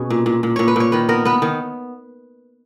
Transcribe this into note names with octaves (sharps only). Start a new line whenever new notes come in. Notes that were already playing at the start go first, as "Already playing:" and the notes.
Already playing: B2 C#4 G#4
A#2
A#2
A#2
A#2 C#5
B4
A#2 C#5
D#3 B4
B3 A#4
B3 B4
D#3